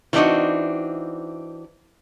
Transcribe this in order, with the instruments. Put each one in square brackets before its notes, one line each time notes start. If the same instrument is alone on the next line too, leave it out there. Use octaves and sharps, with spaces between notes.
[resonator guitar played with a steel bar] E3 G3 C4 D4 D#4 F#4